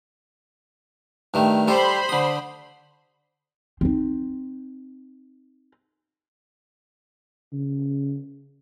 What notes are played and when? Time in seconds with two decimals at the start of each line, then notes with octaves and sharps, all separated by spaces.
1.34 G2 D#3 A3
1.68 G3 A4 C5 B5
2.09 D3 D#6
3.81 C4 D#4
7.52 C#3